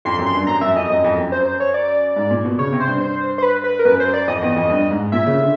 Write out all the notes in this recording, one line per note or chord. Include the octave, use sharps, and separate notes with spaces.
F2 C6
F#2
C6
G2
F#2 A#5
F#2 E5
F2 D#5
F#2
F2
F#2
C5
C5
C#5
D5
G#2
A#2
B2
C#3 C#5
C3
C5
G2
C5
C5
B4
B4
A#4
F#2 B4
C5
D5
F2 D#5
E2
F2
G2
G#2
A#2 E5
C#3
D3